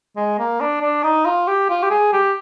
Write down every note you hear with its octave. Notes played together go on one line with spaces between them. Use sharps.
G#3
A#3
D4
D4
D#4
F4
G4
F4
G4
G#4
G4